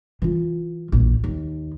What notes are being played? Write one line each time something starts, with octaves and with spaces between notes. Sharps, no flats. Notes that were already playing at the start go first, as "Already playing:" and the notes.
E3 F4
A#1 E2
D#2